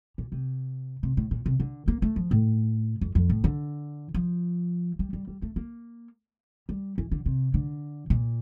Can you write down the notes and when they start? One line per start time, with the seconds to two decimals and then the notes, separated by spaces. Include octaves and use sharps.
0.18 A#2
0.32 C3
1.03 C3
1.17 A2
1.31 A#2
1.46 C3
1.60 D3
1.88 A#3
2.02 A3
2.16 F3
2.31 A2
3.01 F2
3.15 F2
3.30 A2
3.44 D3
4.14 F3
4.99 G3
5.13 G3
5.28 G3
5.42 A3
5.56 A#3
6.69 G3
6.98 E3
7.12 D3
7.26 C3
7.54 D3
8.10 A#2